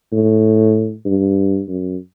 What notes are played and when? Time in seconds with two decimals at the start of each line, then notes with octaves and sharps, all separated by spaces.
0.12 A2
1.05 G2
1.69 F#2